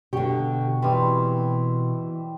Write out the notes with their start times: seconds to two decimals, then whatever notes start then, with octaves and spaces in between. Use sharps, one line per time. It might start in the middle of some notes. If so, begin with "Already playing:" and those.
0.13 B2 D3 G4 G5 C#6
0.82 E3 G3 C4